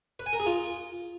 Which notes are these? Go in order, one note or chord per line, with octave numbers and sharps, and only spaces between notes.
B4
G#5
A#4
G#4
F4